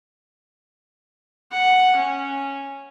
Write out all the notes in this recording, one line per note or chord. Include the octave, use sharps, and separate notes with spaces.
F#5
C#4